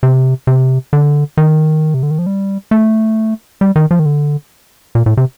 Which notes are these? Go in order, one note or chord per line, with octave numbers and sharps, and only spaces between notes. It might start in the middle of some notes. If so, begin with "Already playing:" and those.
C3
C3
D3
D#3
C3
D3
D#3
F3
G3
A3
G3
D#3
F3
D#3
D3
A#2
A2
C3